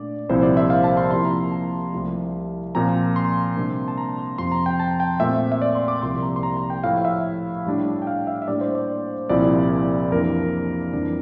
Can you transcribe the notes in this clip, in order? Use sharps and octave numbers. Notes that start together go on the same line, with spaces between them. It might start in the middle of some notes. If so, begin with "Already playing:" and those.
Already playing: A#2 A3 D4 D5
C2 A#2 F3 C4 E4 C5
D5
E5
F5
A5
C6
C3 F3 A#3 E4 C6
A#5
A5
C2 C3 F3 A3
A#2 F3 C4 A#5
C6
C3 G3 A#3 D4
A5
A#5
C6
F2 C3 F3 C6
A#5
G5
A5
G5
A#2 A3 C4 E5
E5
D5
C6
D6
C2 C3 F3 A#3 C6
A#5
C6
A#5
A#5
G5
A2 F3 A3 E4 F5
E5
A2 G3 D4
G5
F5
E5
E5
A2 G3 A#3 D4 D5
C5
D5
C2 A#2 F3 C4 E4 D5
F2 E3 A#3 D4 A#4
F2 E3 G3 D4